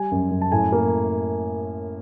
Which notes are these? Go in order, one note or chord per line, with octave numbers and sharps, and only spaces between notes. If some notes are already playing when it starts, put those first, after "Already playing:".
Already playing: G3 G#5
F#2
F#2
A5
A2 G#5
A#3